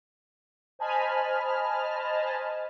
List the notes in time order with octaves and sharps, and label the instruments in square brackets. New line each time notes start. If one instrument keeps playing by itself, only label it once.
[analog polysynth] C5 D#5 G#5 A5 B5 F6